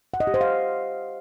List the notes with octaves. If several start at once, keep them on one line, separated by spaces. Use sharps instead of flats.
F#5
D#5
G4
C5
F5